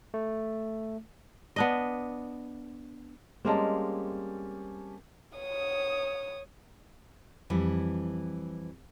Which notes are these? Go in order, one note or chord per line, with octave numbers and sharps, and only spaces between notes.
A3
B3 D4 D#5
G3 G#3 A#3 C4 C#4 A5
C#5 D#6
F2 E3 G3